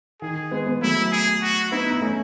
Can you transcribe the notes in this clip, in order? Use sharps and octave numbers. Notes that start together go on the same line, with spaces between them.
D#3 G#4
G#3 B3
G#3 B3
F#3 A3 E4
G#4
F#4
B3 D#4 E4
D#4
A3 C#4